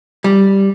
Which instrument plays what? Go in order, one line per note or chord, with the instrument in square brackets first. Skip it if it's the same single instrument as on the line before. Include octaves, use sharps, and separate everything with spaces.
[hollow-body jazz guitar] G3